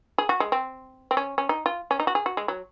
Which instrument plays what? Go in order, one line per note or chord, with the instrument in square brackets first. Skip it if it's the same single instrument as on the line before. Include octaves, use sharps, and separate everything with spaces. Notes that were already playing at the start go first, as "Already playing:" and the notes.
[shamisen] G#4
F#4
G#3
C4
C4
C#4
C#4
D#4
F4
C#4
D#4
F#4
G#4
F#4
G#3
F#3